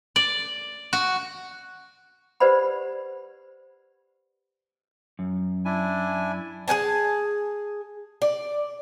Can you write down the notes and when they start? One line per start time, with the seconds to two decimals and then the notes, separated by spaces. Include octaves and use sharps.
0.16 D5
0.93 F#4
2.40 G4 B4 C5 D5 F#5 B5
5.19 F#2
5.65 D4 E4 G#5
6.68 G#4 B4 G#5 A5
8.22 D5